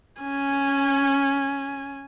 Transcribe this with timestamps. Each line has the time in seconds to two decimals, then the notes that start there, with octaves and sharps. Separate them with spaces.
0.22 C#4 G#5